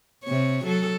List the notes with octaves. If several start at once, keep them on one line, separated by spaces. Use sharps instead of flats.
C3 C#5
F#3 A4